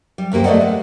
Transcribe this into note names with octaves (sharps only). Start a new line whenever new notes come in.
G3
D2 G2 A#3 G4 C5
A3 A4 B4 D5 D#5 F#5
G#3